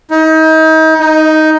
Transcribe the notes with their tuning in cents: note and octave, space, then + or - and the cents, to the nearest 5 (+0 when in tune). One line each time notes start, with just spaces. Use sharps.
D#4 +35
D#4 +5